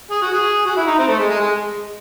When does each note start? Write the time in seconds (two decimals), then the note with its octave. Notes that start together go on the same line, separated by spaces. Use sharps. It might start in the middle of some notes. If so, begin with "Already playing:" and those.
0.11 G#4
0.22 F#4
0.33 G#4
0.65 F#4
0.76 E4
0.87 D#4
0.98 C4
1.08 A3
1.19 G#3
1.30 G#3
1.41 G#3